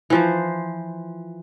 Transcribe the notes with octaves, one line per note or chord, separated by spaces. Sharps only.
E3 F3 C5